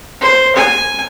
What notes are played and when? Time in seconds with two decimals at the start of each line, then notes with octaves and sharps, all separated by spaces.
0.21 C5
0.56 G#5